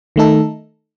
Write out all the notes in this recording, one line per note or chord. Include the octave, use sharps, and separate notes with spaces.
D#3 A3 D#4 A4